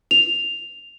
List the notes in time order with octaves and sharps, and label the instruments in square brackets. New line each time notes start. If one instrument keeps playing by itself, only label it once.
[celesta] F7